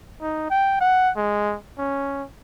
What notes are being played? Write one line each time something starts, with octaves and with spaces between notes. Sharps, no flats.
D#4
G5
F#5
G#3
C#4